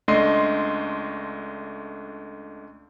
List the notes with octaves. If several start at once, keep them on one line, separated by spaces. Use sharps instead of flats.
C#2 A3 D4 D#5 C6 C7